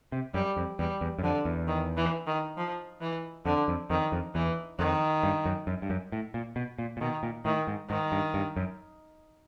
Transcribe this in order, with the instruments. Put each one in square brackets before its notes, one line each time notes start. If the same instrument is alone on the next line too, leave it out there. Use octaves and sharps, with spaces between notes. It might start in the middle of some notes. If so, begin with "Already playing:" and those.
[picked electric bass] C3
[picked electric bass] F#2 [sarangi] G3
[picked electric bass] F2
[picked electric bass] E2 [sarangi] G3
[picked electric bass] E2
F#2
[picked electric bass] F2 [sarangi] D3
[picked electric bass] E2
[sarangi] D#3
E3
D#3
F3
E3
[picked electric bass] F2 [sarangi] D3
[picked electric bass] F2
[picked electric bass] F2 [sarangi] D#3
[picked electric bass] F2
[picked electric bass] E2 [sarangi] E3
[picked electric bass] F2 [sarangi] D#3
[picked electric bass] G2
F#2
F#2
G2
F#2
A2
A#2
B2
A#2
A#2
[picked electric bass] B2 [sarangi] D#3
[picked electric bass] A#2
[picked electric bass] A2 [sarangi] D#3
[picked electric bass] G#2
[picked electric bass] G#2 [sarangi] D#3
[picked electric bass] G2
G2
F#2